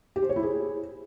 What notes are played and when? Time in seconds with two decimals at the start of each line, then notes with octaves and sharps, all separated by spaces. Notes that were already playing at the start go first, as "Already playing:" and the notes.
0.16 G4
0.23 C5
0.29 C#5
0.36 E4
0.43 G#4